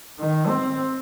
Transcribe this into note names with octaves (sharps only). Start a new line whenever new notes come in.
D#3
C4